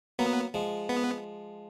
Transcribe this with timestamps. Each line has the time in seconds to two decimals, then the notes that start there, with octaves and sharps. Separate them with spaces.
0.19 F#3 A#3 B3
0.54 F3 G#3
0.89 B3